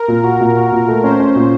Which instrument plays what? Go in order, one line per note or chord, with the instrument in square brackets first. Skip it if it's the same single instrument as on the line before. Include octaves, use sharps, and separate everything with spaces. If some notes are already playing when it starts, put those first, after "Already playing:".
Already playing: [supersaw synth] A#4
[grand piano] A#2
F#4
A#2
F#4
A#2
A3
[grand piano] C#4 [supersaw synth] C5
[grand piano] C#4
A#2